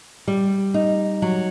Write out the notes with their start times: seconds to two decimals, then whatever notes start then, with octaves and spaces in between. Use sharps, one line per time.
0.28 G3
0.74 D#4
1.22 F#3